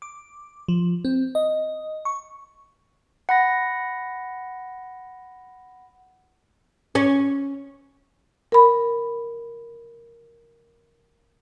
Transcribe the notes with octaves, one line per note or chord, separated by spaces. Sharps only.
D6
F3
C4
D#5
C#6
F#5 B5 A#6
C#4
A#4 B5